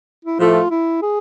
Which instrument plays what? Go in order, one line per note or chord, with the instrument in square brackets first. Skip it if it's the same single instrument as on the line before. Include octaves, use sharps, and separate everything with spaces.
[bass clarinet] E4
[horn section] A2 F3 A3 [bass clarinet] F4
[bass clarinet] E4
G#4